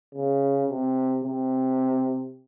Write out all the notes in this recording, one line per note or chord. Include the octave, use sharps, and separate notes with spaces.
C#3
C3
C3